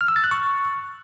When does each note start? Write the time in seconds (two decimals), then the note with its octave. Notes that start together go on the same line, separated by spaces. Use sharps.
0.01 F6
0.08 E6
0.16 A6
0.24 F#6
0.31 C#6